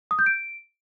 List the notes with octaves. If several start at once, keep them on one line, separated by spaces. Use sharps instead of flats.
D#6
G6
D7